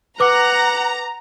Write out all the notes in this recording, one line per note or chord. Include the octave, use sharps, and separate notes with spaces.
B4 F#5 A#5 D6